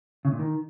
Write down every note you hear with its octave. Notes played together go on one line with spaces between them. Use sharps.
C#3
A#2
D#3